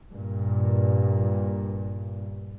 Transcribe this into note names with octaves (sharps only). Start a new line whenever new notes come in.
G2 A#2